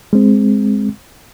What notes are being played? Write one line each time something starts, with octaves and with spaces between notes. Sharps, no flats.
G#3 C4